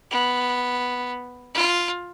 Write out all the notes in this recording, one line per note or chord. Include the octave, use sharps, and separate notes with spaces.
B3
F4